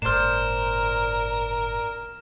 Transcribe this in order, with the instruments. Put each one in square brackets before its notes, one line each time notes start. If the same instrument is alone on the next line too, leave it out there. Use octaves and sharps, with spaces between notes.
[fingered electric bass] G1 A2 [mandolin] D4 C5 [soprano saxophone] A#4 [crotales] F6 E7